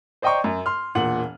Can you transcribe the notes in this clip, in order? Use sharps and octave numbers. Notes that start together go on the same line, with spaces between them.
C5 D5 D#5 G5 A#5 C#6
F#2
C6 F6
E1 A#2 F#5 F#7